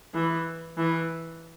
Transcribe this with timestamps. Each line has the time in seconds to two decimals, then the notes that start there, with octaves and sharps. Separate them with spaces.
0.14 E3
0.77 E3